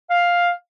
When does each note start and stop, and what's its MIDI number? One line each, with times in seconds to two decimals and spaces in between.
0.10 0.48 77